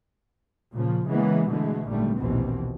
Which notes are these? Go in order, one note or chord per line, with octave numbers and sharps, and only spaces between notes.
A#2 C#3 F3
C#3 E3 G#3 A#3 B3
B2 D3 E3 G#3 A3
G#1 A#2 D3 G3 A3
A#1 D#2 B2 E3 C4